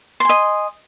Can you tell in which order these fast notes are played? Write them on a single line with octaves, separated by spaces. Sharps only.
C6 G#5 D#5